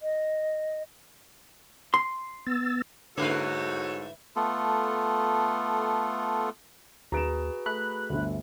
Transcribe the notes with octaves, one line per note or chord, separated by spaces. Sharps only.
D#5
C6
B3 E6 A6
G#2 D3 A3 E4 F#4 A4 B4 C#5
A3 B3 F4 A4
D#2 F#4 G#4 B4 A#5 D7 E7
A3 B5 F#6
G1 D2